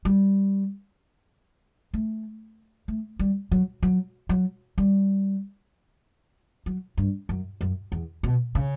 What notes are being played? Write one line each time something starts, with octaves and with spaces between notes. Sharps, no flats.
G3
A3
A3
G3
F#3
F#3
F#3
G3
F#3
G2
F#2
F#2
E2
B2
C#3